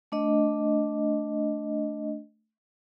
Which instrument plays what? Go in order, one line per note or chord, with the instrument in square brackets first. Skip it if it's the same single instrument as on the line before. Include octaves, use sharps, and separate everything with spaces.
[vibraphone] A3 D4 D#5